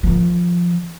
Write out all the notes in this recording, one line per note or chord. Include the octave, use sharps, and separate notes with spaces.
D#3 F3